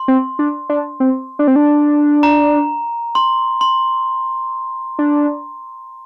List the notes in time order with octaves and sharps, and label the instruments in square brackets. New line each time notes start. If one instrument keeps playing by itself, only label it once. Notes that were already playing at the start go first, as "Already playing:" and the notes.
Already playing: [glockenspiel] C6
[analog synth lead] C4
D4
D4
C4
D4
C4
D4
[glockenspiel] A#5
C6
C6
[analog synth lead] D4